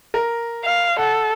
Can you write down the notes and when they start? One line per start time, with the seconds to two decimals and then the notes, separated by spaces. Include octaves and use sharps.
0.14 A#4
0.64 F5
0.98 A4 F#5